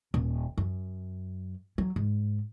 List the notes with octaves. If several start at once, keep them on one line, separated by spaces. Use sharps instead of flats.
D#1
F#2
F#3
G#2